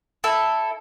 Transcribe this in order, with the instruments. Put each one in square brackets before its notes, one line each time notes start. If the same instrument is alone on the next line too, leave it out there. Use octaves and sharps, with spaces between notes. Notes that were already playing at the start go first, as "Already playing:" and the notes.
[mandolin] E4 A4